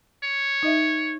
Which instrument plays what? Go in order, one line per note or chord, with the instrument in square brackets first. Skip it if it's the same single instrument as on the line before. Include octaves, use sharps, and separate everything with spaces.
[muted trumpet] C#5
[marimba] D#4 D#5 E5